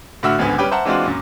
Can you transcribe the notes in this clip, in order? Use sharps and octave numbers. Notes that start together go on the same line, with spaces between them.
A2 D3 F#4 E5 E6 F6
G#1 C#2 D3 B3 G#5
G3 C#4 B4 G5 D6
C5 E5 F#5 A5 A#5
E3 G#3 C4 D4 F4 F#4
F#2 A#2